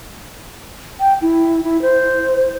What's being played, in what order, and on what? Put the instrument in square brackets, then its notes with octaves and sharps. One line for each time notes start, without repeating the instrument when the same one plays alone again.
[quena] G5
E4
E4
C5